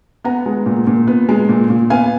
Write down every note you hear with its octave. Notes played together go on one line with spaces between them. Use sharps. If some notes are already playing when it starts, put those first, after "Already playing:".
B3 F#5 A#5
G#3
A#2
A#2
B3
G#3
A#2
A#2
B3 F5 G#5